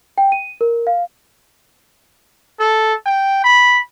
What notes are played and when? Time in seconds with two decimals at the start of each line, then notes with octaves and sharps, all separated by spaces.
0.18 G5
0.32 D#7
0.61 A#4
0.87 F5
2.60 A4
3.06 G5
3.44 B5